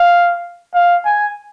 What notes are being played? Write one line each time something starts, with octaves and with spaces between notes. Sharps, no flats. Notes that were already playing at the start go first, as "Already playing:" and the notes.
Already playing: F5
F5
G#5